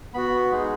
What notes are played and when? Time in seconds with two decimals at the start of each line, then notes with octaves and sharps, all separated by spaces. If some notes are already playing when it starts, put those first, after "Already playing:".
0.14 B3 F#4 B5
0.51 G#3 D#4 G#4